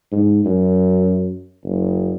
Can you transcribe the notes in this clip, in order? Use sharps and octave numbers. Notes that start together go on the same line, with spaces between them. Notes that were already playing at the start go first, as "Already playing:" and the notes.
G#2
F#2
F#1